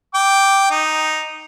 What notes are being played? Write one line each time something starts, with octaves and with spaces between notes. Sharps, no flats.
G5 D6
D#4